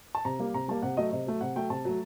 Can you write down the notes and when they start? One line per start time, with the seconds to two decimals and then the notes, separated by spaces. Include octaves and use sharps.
0.15 A5
0.25 C3 A#5
0.39 G3 A#3
0.54 C3 A#5
0.68 G3 A#3 A5
0.83 C3 F#5
0.97 F#3 A3 D#5
1.12 C3 D#5
1.27 F#3 A3
1.41 C3 F#5
1.56 F#3 A3 G5
1.70 C3 A5
1.85 F#3 A3